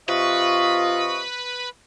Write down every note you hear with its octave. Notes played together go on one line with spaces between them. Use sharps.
C3 F4 B4 D#5 C#6